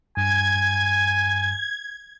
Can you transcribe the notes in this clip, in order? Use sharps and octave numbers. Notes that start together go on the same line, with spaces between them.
G2 G#5 G#6